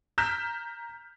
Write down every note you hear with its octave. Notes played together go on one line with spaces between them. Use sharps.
A#5 F6 G6 B6 E7